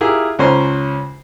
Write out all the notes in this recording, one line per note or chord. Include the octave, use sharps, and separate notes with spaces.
E4 F4 G4 G#4 A#4
C#2 C#4 C5 A#5